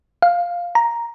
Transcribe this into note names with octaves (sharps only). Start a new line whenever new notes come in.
F5
A#5